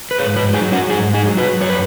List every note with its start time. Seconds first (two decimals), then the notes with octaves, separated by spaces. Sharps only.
0.11 B4
0.18 G#2 G#4 C#5
0.36 F#4 B4
0.53 F#3 D#4 G#4
0.72 C#4 F#4
0.90 G#2 D#4 G#4
1.14 D#4 G#4
1.26 F#3
1.37 F#4 B4
1.61 F#2 C#5
1.70 B4